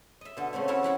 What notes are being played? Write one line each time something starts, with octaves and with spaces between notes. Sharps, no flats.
D#5 E5
B2 D3 A4
C#3 A3 C4 C#5
C#4 E4 F#4 A4 C#5
F3 E4 F#5 B5